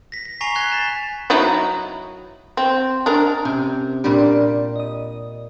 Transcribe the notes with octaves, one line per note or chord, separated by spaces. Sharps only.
A#6 B6
B6
G#5 A#5 C#6 A#6 C7 F7
G#5 F#6 G#6 C7 G7
A6 B6 E7
F#3 D#4 E4
C4
G#3 D4 A#4
C3 C#4
A#2 G3 D4 G4
D#5 D#6